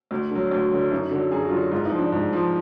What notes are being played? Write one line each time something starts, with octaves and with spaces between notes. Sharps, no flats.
D2
D3 F#3
D2
D3 F#3
F#2 D#4
D3 F#3
F#2 G#4
F#4
D3 F#3 F4
F#4
G#2 F4
D#4
F3
D4
G#2
F3